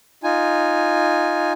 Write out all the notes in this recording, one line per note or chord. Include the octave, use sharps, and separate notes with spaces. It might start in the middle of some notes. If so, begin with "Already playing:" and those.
D#4 F4 G#5